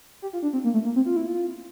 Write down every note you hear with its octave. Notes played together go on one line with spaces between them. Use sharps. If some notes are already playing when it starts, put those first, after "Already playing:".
G4
F4
D4
C4
A#3
A3
A#3
C4
F4
E4
F4